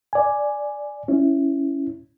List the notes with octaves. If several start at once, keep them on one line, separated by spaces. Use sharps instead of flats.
D5 G#5
C#4 E4